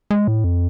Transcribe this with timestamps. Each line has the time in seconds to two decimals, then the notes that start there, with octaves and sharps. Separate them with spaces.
0.11 G#3
0.28 A2
0.44 F2